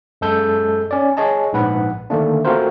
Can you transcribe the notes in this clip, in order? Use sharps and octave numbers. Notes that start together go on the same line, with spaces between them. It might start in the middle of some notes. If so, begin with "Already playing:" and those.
F#2 G#3 A4 G6
C#4 D5
G#4 C#5 D#5 A5
A#1 G#2 B4 F#5 B5
D3 D#3 A3 A#3 D4
A3 C4 F4 F#4 A#4 C5